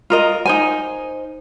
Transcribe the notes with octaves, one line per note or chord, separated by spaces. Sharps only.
F4 A#4 D#5
D#4 C5 G#5